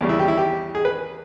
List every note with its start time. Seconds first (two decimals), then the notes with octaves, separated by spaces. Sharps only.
0.01 E2 C#3 G3
0.09 E4
0.19 G4
0.28 E4
0.38 G4
0.75 G#4
0.85 B4